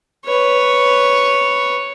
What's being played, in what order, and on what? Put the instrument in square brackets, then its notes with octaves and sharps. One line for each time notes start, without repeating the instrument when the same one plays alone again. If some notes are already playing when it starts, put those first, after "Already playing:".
[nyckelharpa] B4 C#5